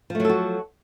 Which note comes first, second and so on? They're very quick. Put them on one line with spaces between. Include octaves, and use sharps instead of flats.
F3 A3 F#3 A4 F#4